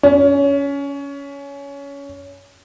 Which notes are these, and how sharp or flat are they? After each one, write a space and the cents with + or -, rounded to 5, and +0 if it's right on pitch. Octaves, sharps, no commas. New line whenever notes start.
C#4 +20